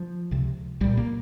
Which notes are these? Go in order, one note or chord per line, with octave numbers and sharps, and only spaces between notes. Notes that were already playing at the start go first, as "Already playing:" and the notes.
Already playing: F3
C#2 C3
C2 A#2 G3
A#3